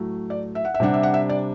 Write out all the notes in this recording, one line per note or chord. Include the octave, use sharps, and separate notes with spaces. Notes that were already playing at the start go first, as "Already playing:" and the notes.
Already playing: A2 F#3 A3
D5
E5
F#5
E5
C3 G3 D4 F#5
E5
F#5
E5
D5